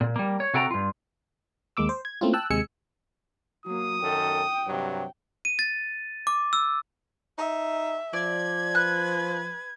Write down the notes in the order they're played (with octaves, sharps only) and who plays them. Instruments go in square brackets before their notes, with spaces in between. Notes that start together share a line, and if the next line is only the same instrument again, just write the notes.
[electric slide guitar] A#2
G3 A#3
C#5
C3 F#4 A4 G5 G#5 A#5
G2 F4
[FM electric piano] D#2 G#3 A#3 D6 E6
C5
G#6
A3 A#3 C4 C#4 E4 F4
G5 A5 E6 F#6
D#2 C3 G#3 G#5 E6 C#7
[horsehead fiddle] F#3 A#3 [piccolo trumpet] D#6
[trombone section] F#2 D#3 A4 [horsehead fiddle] G5
[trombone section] G2 C3 F#3
[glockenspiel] D#7
A6
D6
E6
[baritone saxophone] D#4 [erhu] E5
[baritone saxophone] F3 [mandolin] D5 [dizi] G#6
[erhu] B4 [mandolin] F#6